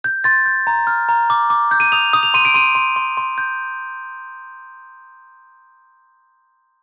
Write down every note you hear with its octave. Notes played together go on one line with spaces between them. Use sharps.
G6
C6 A6
G6
A#5
F6
A#5
D6
D6
G6
D#7
D#6 F7
D#6
F7
C6 D#7
D7
C6 D#7
C6
C6
C6
G6